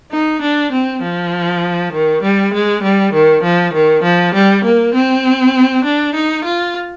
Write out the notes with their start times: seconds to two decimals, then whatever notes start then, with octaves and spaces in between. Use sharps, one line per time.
0.12 D#4
0.42 D4
0.72 C4
1.02 F3
1.93 D#3
2.23 G3
2.54 G#3
2.83 G3
3.13 D#3
3.43 F3
3.74 D#3
4.03 F3
4.34 G3
4.64 A#3
4.94 C4
5.85 D4
6.15 D#4
6.45 F4